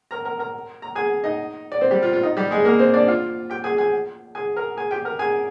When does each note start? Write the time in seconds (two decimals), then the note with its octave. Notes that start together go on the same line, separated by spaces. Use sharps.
0.11 A#4 A#5
0.25 A#4 A#5
0.39 A#4 A#5
0.82 A#5
0.95 G#4 G#5
1.24 D#4 D#5
1.72 D5
1.81 C4 C5
1.91 G3 G4
2.03 F4
2.13 F4
2.23 D#4
2.37 G3 G4
2.51 G#3 G#4
2.65 A#3 A#4
2.79 C4 C5
2.94 D4 D5
3.08 F4 F5
3.50 G4 G5
3.64 G#4 G#5
3.78 G#4 G#5
4.35 G#4 G#5
4.56 A#4 A#5
4.77 G#4 G#5
4.91 G4 G5
5.05 A#4 A#5
5.19 G#4 G#5